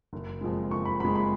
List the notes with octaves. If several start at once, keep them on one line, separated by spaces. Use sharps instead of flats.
F#1
F2 F3 G#3
F#1 C#6
B5
F2 F3 G#3 B5
B5